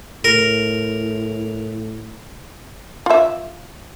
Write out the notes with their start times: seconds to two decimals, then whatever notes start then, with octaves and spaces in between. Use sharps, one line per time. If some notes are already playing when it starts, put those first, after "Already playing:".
0.24 A2 A#4
3.06 F4 E5